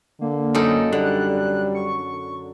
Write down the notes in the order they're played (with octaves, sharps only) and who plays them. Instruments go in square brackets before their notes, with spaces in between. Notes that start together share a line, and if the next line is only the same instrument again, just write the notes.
[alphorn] D3 [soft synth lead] A#3
[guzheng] F#2 D#4 A4
[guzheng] D3 [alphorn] G3 [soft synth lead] F#6
[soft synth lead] C#6